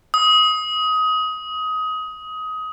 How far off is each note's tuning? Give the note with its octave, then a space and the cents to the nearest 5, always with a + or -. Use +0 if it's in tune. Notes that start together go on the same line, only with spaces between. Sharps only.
D#6 +20